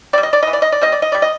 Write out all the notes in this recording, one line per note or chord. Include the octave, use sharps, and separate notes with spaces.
G3 C4 D5
D#5
D5
E3 D#5
D5
D#5
D5
G3 C4 D#5
D5
D#5
G3 D5
D#5